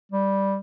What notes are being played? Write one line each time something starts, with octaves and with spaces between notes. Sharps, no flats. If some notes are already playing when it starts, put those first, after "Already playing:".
G3